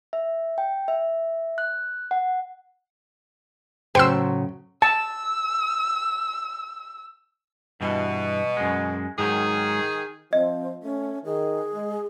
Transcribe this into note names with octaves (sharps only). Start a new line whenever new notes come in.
E5
G5
E5
F#6
F#5
A2 C#3 F#3 C5 G5 C6 E6
A5 E6
G2 B2 E3
F#2 G#3
G#2 D#3 F#3 G#4
F3 C4 D#5
A3 C#4
D#3 G#4
G#3